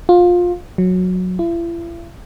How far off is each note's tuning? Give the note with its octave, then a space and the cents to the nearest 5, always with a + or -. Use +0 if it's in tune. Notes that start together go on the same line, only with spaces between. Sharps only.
F4 +20
F#3 -15
E4 +45